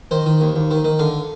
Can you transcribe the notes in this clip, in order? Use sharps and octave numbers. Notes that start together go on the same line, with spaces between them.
D#3 C5
D#3
D#2
D#2
D#3
D#3
D3 F5